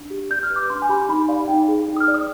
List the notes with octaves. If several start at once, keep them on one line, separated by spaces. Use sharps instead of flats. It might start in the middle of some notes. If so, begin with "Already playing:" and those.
Already playing: D4
G4
D5 G6
F6
B4
D6
D4 C6
G#5
G4 B5
D#4 B5
D5 F5
D#4 G5
G#4
D#4
D#6
F6
D5
D#6